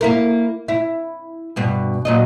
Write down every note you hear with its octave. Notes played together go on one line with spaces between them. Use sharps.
A#3 E4 A#4
E4
G2 B2
A#2 F#3 D#5